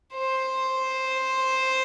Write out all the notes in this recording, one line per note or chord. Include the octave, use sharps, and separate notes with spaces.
C5